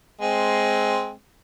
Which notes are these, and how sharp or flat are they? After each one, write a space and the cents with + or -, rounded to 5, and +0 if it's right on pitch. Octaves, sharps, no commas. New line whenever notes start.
G#3 +10 C4 +0